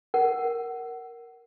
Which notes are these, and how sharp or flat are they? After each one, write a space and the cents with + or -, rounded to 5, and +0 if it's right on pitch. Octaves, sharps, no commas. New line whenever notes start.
A#4 +0 F#5 +20